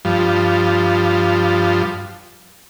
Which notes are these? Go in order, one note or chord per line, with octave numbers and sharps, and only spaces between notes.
G2 F3